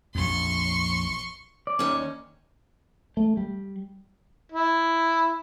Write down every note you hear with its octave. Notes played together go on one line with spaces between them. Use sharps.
A#1 F2 C6 C#6
D5
D#2 D#3 C#4
A3
G3
E4